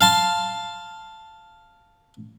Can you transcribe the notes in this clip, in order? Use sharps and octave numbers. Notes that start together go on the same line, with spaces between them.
F5 A5 C6